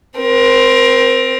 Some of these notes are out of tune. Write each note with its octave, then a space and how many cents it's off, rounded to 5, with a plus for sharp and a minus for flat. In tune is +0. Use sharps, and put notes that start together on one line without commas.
C4 +0 A#4 +25